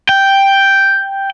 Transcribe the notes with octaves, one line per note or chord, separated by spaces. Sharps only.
G5